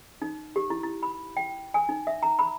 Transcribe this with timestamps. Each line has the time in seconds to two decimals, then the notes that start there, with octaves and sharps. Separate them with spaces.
0.22 D#4
0.56 G4
0.70 E4
0.83 E4
1.03 B5
1.37 G5
1.74 G#5
1.89 D#4
2.07 E5
2.23 A#5
2.39 B5